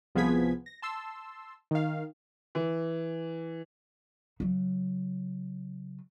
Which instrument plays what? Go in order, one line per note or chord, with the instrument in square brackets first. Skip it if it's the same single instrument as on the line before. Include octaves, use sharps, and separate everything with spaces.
[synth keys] C2 F3 B3 G#4 G#6 B6
A#6
A5 C6 E6
D#3 F5
[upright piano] E3
[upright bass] C#3 F#3